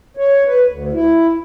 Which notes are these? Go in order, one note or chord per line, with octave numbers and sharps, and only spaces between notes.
C#5
B4
D2
E4